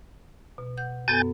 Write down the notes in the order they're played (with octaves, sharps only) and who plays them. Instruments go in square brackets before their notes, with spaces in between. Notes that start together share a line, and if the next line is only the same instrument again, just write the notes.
[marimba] B2
F#5 G6
[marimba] F#2 B3 A4 [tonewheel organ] G#5 G6 A6